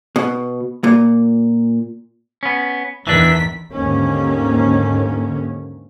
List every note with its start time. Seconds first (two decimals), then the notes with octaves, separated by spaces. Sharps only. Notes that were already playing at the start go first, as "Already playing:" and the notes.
0.16 B2
0.84 A#2
2.43 B3 C#4
3.07 E2 D#3 E3 D4 B6
3.72 D#2 G#2 D3 D#3 A#3 C#4